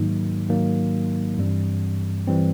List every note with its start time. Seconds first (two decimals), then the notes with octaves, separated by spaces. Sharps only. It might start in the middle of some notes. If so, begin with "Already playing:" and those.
Already playing: G#2 D#3 F#3 A#3 D#4
0.48 G#2 D#3 F#3 A#3 D#4
1.37 G2 E3 G3 C4
2.27 E3 G3 C4